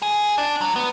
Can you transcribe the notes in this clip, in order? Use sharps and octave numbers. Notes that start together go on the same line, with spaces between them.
G#4
D4
F#3
B3